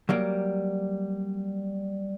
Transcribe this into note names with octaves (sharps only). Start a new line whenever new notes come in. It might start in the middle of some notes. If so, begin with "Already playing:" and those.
F#3 G3 A#3